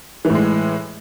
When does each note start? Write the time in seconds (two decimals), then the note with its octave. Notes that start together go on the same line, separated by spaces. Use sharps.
0.25 E3
0.30 A2
0.35 G#3